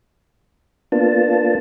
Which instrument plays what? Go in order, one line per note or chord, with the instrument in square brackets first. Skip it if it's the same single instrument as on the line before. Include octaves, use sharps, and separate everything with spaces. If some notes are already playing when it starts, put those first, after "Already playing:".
[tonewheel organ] A#3 B3 D4 F4 A5